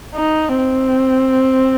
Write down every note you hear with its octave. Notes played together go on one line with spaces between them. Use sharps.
D#4
C4